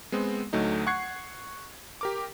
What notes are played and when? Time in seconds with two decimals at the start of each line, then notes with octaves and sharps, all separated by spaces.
0.12 G#3 B3 C4
0.53 D2 F#3 A3 D#4
0.87 F#5 C#6 F#6 G#6 C7
2.01 G4 A#4 D6